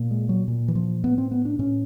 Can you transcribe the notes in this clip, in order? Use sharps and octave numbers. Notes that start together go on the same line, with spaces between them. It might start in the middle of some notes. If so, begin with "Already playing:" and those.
Already playing: A#2
G#3
F#3
A#2
E3
F3
A2 B3
C4
B3
D4
A2 C#4